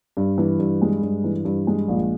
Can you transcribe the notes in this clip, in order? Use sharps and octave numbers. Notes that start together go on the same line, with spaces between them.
G2
E3
G2
G#3
G2
E3
G2
G#3
A#1